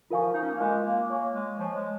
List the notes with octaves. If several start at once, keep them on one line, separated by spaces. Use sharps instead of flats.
F3 F4 A#4 F5 G#5 C#6
D#4
C#4
A#3
G#3 F4 A#4 F5 G#5 C#6
A#3
A#3 C#5 G#5 C#6
G#3
F3 C#5 G#5 C#6
G#3